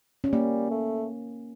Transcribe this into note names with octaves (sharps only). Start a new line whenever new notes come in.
C#4
G3 A#3
A3